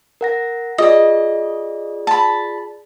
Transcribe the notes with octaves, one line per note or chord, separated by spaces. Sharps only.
A#4 F#5 A#6
F4 G#4 D5 D#5
A5 B5